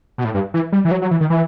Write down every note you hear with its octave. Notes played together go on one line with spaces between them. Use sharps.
B2
A2
G2
E3
G3
E3
F#3
F#3
E3
D#3
E3